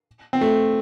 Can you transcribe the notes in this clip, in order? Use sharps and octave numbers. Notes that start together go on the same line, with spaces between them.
C4
A3